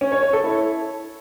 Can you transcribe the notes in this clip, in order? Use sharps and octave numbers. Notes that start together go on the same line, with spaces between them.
C#4
C#5
C#5
A4
E4